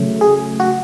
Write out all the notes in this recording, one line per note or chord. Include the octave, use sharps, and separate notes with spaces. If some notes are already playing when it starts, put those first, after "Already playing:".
Already playing: C#3 F#3 A3
G#4
F#4